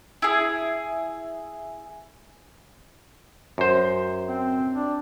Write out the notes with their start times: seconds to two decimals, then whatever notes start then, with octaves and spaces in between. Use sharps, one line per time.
0.22 E4 G#4
3.58 F#2 C5
4.28 C4
4.74 D4